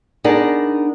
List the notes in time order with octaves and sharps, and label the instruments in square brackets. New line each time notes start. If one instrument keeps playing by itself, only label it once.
[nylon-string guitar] B3 D4 D#4 G#4 A#4 D5